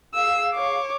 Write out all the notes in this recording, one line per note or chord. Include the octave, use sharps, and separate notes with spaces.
G#4 F5 E6
C#5 D6